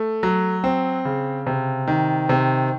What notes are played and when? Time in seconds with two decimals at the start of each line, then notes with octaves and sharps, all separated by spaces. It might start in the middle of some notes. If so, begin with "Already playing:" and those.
Already playing: A3
0.23 F#3
0.64 C4
1.05 C#3
1.47 C3
1.88 D#3
2.29 C3